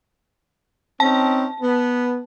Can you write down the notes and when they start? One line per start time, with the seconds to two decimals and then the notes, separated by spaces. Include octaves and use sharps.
1.00 C4 C#4 D#4 A5
1.61 B3